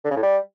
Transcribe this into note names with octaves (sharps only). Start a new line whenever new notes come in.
D3
C#3
A2
G3